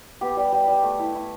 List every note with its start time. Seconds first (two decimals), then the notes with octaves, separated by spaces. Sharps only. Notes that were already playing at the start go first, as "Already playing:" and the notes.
0.21 B3 G4
0.37 G3
0.52 G3
0.68 G3
0.83 A3
0.99 E4
1.15 E4